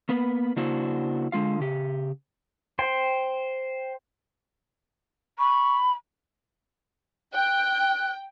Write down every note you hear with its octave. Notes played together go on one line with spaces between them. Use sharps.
A#3 B3 B4
C#3 A#3 D4 E4 F#4 C5
D3 G#3 F4 F5
C#3 G4
C5 G5
B5 C#6
G5 F#6